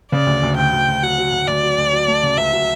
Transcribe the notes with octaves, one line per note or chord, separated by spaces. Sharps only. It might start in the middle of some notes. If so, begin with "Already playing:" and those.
C#3 D5
D2
D2
D2 G5
D2
D2
F#3 F#5
F#3
D2
D2 D5
F#3
D2
F#3
A3
C#3
C#2 E5
F#3